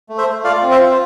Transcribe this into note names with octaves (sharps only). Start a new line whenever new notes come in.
A3
C5 E5
A3
F4 D5 F5
C4
C5 E5
F4
C5